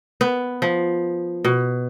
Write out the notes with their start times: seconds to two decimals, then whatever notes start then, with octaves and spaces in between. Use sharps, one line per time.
0.21 B3
0.62 F3
1.45 B2